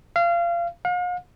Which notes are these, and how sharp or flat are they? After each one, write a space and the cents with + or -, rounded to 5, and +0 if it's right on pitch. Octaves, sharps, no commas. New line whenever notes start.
F5 -25
F5 +45